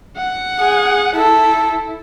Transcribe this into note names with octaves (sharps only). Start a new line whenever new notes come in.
F#5
G#4
E4 A4